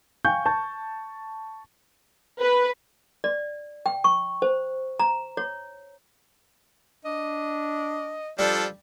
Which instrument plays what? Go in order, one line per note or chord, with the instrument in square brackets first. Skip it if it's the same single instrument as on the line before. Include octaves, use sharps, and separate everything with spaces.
[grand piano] F5 G5 G#5 C#6 G6
A5 C#6 G6
[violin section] B4
[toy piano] D5
G5
C#6
C5
A#5
C#5
[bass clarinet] D4 [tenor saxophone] D#5
[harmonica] F3 D4 A4 [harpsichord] G3